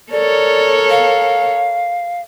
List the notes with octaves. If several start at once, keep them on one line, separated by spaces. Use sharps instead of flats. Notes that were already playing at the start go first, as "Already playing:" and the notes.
A4 A#4 C#5 D5
F5